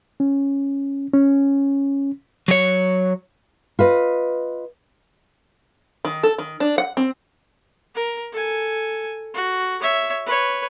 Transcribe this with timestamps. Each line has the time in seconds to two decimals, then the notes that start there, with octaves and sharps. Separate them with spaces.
0.20 C#4
1.14 C#4
2.48 F#3 C#5
3.79 F4 B4 D#5
6.05 D#3
6.23 A4
6.38 D#3
6.60 D4
6.78 F#5
6.97 C4
7.95 A#4
8.32 A4 G#5
9.34 F#4
9.82 C#5 E5
10.26 B4 C#5